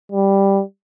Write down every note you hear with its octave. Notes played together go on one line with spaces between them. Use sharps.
G3